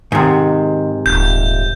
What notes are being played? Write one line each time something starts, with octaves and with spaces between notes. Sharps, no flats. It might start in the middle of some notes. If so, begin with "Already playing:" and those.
G#2 C3 D#3
D#1 G6